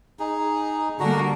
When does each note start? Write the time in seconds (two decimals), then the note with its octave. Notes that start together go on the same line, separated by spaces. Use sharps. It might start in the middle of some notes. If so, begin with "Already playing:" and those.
0.19 D#4 G#4
1.00 D3 G3 A#3 D4 F#4 A#5